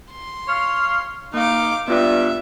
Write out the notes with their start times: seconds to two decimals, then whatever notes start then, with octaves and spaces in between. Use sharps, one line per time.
0.12 C6
0.48 C#5 F5
1.34 A#3 D#4 F5 D6
1.88 G2 B3 F4 D5 E5